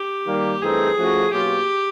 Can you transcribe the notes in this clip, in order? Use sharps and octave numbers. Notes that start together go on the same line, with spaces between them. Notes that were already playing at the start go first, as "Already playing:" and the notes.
Already playing: G4
D#3 G3 A#3
G2 E3 A3 C4 D#4 G#4
F3 A3 C#4 F#4
B2 F#3 A#3 C#4 F4 G4